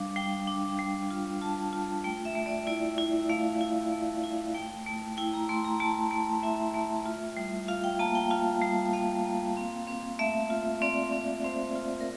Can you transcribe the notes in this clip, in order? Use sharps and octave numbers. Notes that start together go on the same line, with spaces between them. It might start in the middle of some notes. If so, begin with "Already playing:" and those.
Already playing: G3 D4 F5
G3 G5
D4
G3
F4
F4 A5
F4
A3 G5
E5
A3
D5
E4 D5
E4
A3 F5
E4
A3
E4
A3 G5
A3
E4 G5
A#5
A3 C6
A#5
A3 A5
A3
E4 E5
A3
F4
G3
F4 F5
G5
A#3 A5
G5
F4 F5
G3
A#3 F5
A#3
C4
C4
A3 E5
F4
C4 D5
C4
C4 C5
F4
A#4